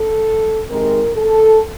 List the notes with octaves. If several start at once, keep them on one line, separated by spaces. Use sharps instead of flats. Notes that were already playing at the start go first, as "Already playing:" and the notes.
Already playing: A4
C3 D#3 G#3 C4 A#4
A4